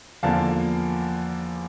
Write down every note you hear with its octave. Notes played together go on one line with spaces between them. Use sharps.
E2 D3 F3 A#3 F5 A5